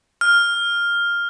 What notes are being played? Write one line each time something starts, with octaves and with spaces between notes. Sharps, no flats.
F6